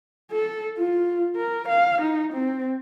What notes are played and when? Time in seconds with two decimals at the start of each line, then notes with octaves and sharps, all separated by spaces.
0.32 A4
0.78 F4
1.36 A#4
1.69 F5
2.02 D#4
2.33 C4